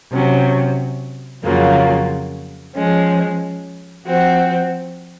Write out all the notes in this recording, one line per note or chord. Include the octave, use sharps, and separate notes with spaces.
C3 F#3 C#4
F2 C#3 F#3 A#3 F4
F3 G#3 C#4
F3 C4 F#4